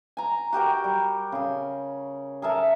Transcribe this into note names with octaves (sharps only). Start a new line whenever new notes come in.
G#5 A#5
F#4 G4 A#4 G5
G3
C#3 G#4
G#4 A#4 E5 A5